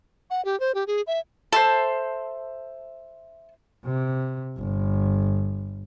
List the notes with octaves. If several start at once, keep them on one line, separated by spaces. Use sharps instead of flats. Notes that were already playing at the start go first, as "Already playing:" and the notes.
F#5
G4
C5
G4
G#4
E5
A4 C5 E5 C6
C3
G1